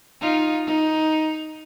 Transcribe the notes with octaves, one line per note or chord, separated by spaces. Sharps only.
D#4 F4
D#4